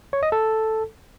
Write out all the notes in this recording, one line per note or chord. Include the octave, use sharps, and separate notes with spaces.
C#5
D#5
A4